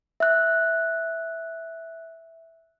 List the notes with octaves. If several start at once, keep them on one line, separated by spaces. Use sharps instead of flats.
E5 F#6